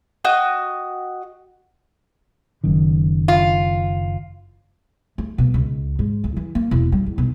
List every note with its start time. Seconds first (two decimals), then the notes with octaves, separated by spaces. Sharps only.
0.25 F#4 D#5 G5 D#6
2.64 F#1 F#2 D#3
3.28 F4
5.18 A3
5.38 B2
5.54 C#2
5.99 G#2
6.24 D2
6.37 E3
6.55 A#3
6.71 E1
6.92 G3
7.06 E2
7.18 B1